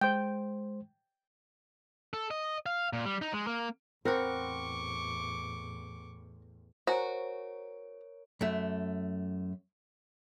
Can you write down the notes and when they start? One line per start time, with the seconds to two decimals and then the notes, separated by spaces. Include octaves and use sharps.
0.01 G#3 C5 G5
2.13 A4
2.31 D#5
2.66 F5
2.93 A#2
3.05 G3
3.22 D#4
3.34 G#3
3.47 A#3
4.05 E2 A2 C4 A#4 F#5 B5 C#6 D6
6.87 F#4 A#4 C5 C#5 G#5 A#5 D7
8.41 F#2 A3